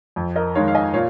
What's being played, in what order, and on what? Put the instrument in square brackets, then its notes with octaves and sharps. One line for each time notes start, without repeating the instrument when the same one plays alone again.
[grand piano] F2
A#4 D#5
D#3 G#3 C#5 F5
F5
D#5 G#5
A#2 C#5 F5